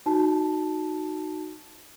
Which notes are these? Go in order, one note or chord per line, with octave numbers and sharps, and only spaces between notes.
D#4 F#4 A5